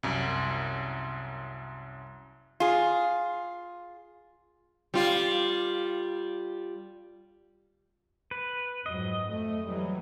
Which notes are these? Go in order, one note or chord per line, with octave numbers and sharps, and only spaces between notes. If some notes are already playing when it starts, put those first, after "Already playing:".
C2 F#2
F4 G#4
G3 F4
B4
F2 G#2 F#3 D#5
F2 A3
E3 F#3 G3